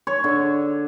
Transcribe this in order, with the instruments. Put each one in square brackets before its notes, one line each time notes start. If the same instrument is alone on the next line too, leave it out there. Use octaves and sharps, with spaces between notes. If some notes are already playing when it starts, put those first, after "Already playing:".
[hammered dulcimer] C#5
D3